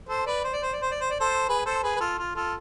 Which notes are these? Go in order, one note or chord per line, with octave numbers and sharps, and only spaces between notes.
A4 C5
B4 D5
C5
D5
C5
D5
C5
D5
C5
D5
A4 C5
G#4 B4
A4 C5
G#4 B4
B4
F4 A4
F4
F4 A4